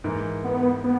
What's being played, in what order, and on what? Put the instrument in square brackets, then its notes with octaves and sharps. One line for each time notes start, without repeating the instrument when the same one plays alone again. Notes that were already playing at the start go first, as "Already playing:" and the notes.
[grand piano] G#2 E3 A#3
[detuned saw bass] B3
B3